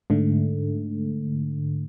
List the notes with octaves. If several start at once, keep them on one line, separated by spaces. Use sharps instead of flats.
G#2 D3 A3